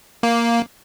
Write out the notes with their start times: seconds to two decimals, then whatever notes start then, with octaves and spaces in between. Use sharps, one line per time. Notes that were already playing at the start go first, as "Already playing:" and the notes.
0.23 A#3